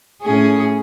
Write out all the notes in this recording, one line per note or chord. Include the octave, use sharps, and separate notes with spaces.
A2 C#4 G#4